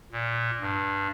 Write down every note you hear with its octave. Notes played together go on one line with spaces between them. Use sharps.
A#2
G2